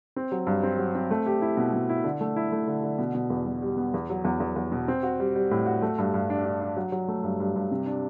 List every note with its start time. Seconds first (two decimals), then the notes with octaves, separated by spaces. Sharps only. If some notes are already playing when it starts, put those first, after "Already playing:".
0.16 C4
0.32 F#3
0.47 G2
0.63 C4
0.78 F#3
0.95 C4
1.11 A3
1.26 G4
1.42 E4
1.57 B2
1.73 B2
1.89 E4
2.04 D3
2.21 A3
2.36 E4
2.52 A3
2.68 D3
2.83 D3
2.98 B2
3.15 B2
3.30 E2
3.46 B2
3.62 G3
3.77 B3
3.94 E2
4.10 F#3
4.25 E2
4.40 E2
4.56 E2
4.72 B2
4.88 C4
5.03 F#4
5.20 G3
5.36 G3
5.51 A2
5.66 F#4
5.82 A3
5.98 G2
6.14 G2
6.30 D4
6.45 D4
6.61 D4
6.76 F#3
6.92 F#3
7.08 A3
7.24 G2
7.40 G2
7.56 G2
7.71 C3
7.86 D4